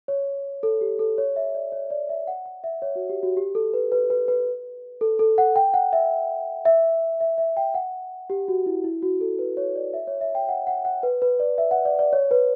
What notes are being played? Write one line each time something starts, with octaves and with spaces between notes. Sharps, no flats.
C#5
A4
G4
A4
C#5
E5
D5
C#5
D5
E5
F#5
F#5
E5
C#5
F#4
G4
F#4
G4
A4
B4
B4
B4
B4
A4
A4
F#5
G5
F#5
E5
E5
E5
E5
G5
F#5
G4
F#4
E4
E4
F#4
A4
B4
C#5
D5
E5
C#5
E5
G5
F#5
F#5
F#5
B4
B4
D5
E5
F#5
D5
D5
C#5
B4